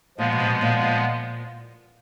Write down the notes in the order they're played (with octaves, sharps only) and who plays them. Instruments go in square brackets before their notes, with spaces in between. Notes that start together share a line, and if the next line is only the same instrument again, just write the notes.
[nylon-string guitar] A#2 [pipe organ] F3 G#3 B3
[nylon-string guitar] B2
B2
A#2
A#2